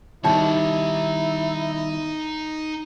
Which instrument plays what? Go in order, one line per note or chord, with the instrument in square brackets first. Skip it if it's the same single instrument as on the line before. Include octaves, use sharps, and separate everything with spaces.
[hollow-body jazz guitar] B2 D#3 G3 [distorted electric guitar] D#4 C#5 [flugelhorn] E4 [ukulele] A5